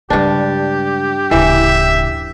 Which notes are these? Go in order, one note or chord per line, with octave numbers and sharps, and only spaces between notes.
G2 C#3 G#3 D4 G4
D1 C#3 E3 E5